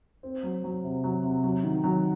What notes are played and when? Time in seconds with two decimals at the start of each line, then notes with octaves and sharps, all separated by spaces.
0.23 C4
0.43 F#3
0.64 F#3
0.84 C3
1.04 F#3
1.23 C3
1.44 F#3
1.63 D#3
1.84 F#3